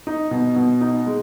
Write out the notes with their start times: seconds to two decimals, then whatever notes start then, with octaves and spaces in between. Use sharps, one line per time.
0.07 D#4
0.31 B2
0.56 B2
0.81 D#4
1.07 G#3